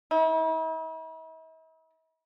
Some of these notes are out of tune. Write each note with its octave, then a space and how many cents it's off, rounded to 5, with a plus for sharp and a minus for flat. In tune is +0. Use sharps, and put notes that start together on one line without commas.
E4 -45